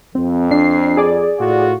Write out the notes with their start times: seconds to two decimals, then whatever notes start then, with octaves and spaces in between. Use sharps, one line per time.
0.15 F2 C4
0.51 D4 C7
0.97 G#4 D5
1.40 A2 F4 F#4